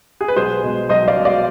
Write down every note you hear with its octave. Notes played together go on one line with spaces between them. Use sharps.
G#4
B4
B1 G#4 C5
B2 G#3
B1 C5 D#5
D5 F5
B2 G#3
D5 F5